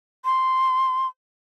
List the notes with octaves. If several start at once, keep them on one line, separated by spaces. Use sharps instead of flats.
C6